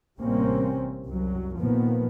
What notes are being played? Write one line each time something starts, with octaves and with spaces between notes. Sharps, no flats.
A1 C3 G3 A#3 C4 C#4
C2 F#2 F#3
A#2 D#3 F3 A#3 B3